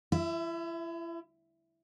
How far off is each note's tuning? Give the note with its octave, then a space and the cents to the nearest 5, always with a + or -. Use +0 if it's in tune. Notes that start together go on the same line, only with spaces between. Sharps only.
E4 +35 E5 +0